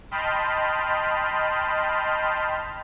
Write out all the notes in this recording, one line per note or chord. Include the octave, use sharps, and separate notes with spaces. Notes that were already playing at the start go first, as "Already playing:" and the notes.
D#5 G5 A5 B5 C6 F6